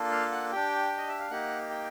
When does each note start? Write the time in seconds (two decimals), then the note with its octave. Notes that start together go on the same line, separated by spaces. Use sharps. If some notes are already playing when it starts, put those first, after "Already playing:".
Already playing: A#3 D4 F4 A4
0.11 F5
0.32 F#5
0.52 D4 G4 G5
0.98 D#5
1.08 E5
1.19 F5
1.31 A#3 D#4 G4 F#5
1.70 G5